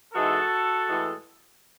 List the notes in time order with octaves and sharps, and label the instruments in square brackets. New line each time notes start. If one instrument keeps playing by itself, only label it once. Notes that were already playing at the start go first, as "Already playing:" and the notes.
[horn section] G#2 E3 G#3 F#4 A4
A2 E3 G#3